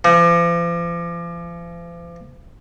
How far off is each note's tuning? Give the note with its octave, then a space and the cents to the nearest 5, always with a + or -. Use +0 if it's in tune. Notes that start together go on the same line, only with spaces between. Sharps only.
F3 -40